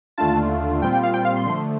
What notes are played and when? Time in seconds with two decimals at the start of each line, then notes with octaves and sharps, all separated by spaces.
0.18 D#2 D3 A3 D4 F4 A5
0.82 A#2 G3 C4 F4 G5
0.93 G5
1.03 F5
1.14 G5
1.25 F5
1.36 C6
1.46 D3 F3 A3